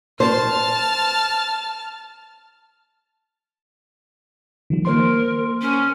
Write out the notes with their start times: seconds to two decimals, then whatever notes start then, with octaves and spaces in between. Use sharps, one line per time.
0.20 C5 A5 F6
4.70 D#3 F3 G3
4.85 A#3 A#4 C5 C6
5.61 C#4